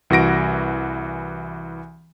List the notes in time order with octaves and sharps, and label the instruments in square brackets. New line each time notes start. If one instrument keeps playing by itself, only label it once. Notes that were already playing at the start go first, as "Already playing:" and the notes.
[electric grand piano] C2 E3 F#4 A#6 D7